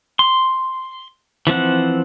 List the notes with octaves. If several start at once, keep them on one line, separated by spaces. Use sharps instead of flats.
C6
E3 F3 C4 F#5